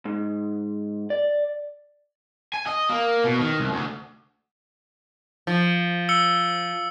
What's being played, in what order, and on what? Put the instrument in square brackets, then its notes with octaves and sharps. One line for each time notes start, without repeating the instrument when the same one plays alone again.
[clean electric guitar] G#2
D5
[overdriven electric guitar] G#5
D#5
A#3
B2
D#3
C2
D2
[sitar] F3
[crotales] E6 C#7 G7